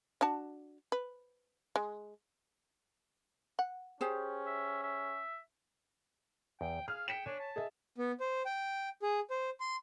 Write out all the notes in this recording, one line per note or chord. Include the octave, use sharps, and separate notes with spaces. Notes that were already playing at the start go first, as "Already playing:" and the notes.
D4 F#4 A5
B4
G#3
F#5
C#4 G4 G#4 C5
E5
E5
E2 G5
G#4 F5 F6
G5 B6 C#7 E7
D4 C#5 G#5
A5
G#4 D#5 E5
B3
C5
G5
G#4
C5
C6